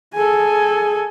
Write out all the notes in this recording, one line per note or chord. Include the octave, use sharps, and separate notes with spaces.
G#4 A4 G#5